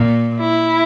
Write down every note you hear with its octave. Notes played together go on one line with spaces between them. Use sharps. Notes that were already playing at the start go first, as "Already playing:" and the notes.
Already playing: A#2
E4